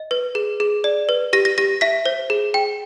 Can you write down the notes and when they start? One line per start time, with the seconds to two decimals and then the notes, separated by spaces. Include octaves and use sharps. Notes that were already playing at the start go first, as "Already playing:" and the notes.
Already playing: D#5
0.11 B4
0.35 G#4
0.60 G#4
0.84 D5
1.09 B4
1.33 G4 A#6
1.45 A#6
1.58 G4 A#6
1.81 E5 B6
2.06 C5
2.30 G#4
2.54 G5